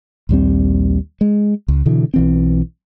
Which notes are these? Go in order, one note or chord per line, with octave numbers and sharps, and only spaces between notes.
A#1 D#2 G3 C4
G#3
C#2
B2 D3 E3
B1 E3 C4